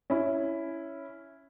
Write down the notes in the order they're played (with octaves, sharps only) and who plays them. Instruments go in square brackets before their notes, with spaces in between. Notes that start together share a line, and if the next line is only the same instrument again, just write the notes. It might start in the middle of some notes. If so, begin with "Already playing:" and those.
[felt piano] C#4 E4